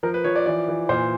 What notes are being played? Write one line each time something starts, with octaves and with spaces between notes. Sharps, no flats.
F3 A#4
B4
F3 C#5
D5
E3 D5
E3
A#2 C5